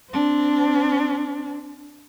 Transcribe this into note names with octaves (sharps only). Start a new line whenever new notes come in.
C4 D4